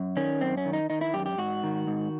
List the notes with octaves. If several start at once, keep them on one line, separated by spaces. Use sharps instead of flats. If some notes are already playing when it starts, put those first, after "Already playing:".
Already playing: F#2
D#3 C#4
F#2 C4
C#4
D#3
D#4
D#3 D#4
E4
F#2 G4
G4
G#2 F#4
D#3
G#2